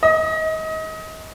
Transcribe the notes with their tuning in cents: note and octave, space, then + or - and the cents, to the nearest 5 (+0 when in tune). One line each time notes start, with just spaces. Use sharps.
D#5 +30